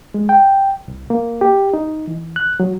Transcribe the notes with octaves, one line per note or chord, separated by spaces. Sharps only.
G#3
G5
C2
A#3
G4
D#4
E3
F#6
F#3